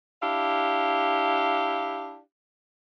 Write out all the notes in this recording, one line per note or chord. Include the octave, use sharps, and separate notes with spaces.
D4 E4 G4 F5